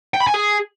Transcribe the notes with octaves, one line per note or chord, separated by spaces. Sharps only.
G5
B5
G#5
G#4